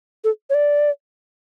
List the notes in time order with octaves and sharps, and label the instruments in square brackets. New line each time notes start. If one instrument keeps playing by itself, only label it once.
[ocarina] A4
C#5
D5